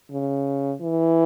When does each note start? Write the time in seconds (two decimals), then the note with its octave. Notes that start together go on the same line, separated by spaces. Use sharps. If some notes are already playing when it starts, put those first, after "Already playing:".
0.11 C#3
0.81 E3